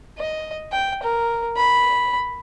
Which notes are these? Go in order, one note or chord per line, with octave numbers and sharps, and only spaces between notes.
D#5
G5
A#4
B5